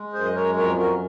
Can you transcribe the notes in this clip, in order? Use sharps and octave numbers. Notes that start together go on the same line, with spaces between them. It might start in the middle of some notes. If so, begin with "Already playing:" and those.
Already playing: G#3
F#2 G#4 C5
D#5
A#4 C#5
F2 A#4 C#5
F#4 A#4